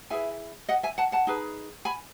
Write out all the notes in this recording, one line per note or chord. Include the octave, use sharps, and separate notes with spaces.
E4 G#4 B4 E5 G#5
D#5 F#5
E5 G#5
F#5 A5
F#5 A5
D#4 G#4 B4
G#5 B5